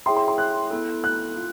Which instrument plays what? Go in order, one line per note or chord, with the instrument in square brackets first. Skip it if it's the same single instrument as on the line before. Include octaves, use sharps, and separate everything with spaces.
[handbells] E4 G#4 C#5 E5 G5 [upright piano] C6
[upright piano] C6
C6
F#6
[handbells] B3 E4 A4
[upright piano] F#6
[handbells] F4